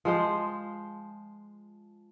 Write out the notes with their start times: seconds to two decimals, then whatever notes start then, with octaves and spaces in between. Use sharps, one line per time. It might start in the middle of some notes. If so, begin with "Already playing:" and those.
0.05 F3 G#3 C5